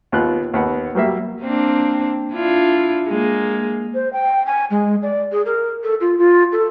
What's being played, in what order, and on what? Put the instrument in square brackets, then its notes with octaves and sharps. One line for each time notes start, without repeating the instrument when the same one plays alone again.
[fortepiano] D#2 B3 F4 F#6
D#2 B3 F#5
F#3 G3 A#3 E5
[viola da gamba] A#3 C4 D4
D4 E4 F4
G#3 A#3
[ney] C5
G5
G#5
G#3
D5
G#4
A#4
A4
F4
F4
A4